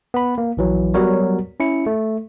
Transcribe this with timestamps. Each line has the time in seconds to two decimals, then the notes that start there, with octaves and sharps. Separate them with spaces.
0.14 B3 B5
0.38 A#3
0.57 A#1 E3 F#3
0.94 F#3 G3 B3 F#4 A#4 C#5
1.60 C#4 E4 C#7
1.86 A3